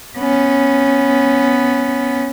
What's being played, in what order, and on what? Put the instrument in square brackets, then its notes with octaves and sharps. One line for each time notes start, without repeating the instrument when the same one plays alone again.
[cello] B3 C#4